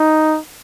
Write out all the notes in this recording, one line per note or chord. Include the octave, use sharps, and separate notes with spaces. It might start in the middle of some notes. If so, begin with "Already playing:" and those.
Already playing: D#4